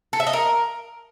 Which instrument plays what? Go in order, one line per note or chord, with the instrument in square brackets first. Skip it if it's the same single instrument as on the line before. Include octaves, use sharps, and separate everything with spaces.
[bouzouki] A4
E5
D#5
A#4